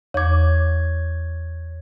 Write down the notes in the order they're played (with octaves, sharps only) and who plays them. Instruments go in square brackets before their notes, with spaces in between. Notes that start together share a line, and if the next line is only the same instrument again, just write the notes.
[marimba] E2 D6 [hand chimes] C#5 G#6